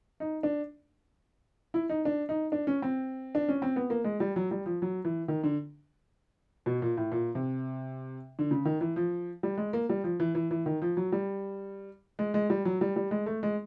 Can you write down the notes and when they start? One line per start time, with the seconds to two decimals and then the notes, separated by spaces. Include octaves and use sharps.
0.20 D#4
0.43 D4
1.74 E4
1.89 D#4
2.05 D4
2.29 D#4
2.52 D4
2.67 C#4
2.82 C4
3.35 D4
3.49 C#4
3.62 C4
3.76 B3
3.90 A#3
4.04 G#3
4.20 G3
4.36 F#3
4.51 G3
4.66 F3
4.82 F#3
5.05 E3
5.28 D#3
5.44 D3
6.66 B2
6.82 A#2
6.97 A2
7.12 A#2
7.35 C3
8.39 D3
8.51 C#3
8.65 D#3
8.81 E3
8.96 F3
9.43 G3
9.58 G#3
9.73 A#3
9.89 G3
10.04 F3
10.20 E3
10.35 E3
10.51 E3
10.66 D#3
10.82 F3
10.97 F#3
11.12 G3
12.19 G#3
12.34 G#3
12.50 G3
12.65 F#3
12.81 G3
12.96 G3
13.11 G#3
13.26 A3
13.43 G#3